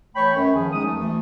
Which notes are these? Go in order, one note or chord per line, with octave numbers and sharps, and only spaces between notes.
E3 A3 C#5 G5 B5
F#2
D#3 F3 G#4
E2 G#3 C#4 D#4 D#6
A3
D2 E3 A3